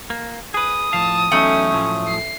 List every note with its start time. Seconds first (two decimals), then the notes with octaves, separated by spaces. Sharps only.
0.10 A#3
0.54 G#4 B4 D#6
0.93 A2 F3 F5 A5
1.32 E2 F#3 A3 C#4 D#4
1.74 A2 F3 F#3
2.08 C7